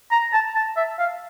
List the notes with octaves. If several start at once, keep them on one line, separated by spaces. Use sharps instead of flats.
A#5
A5
A5
E5
F5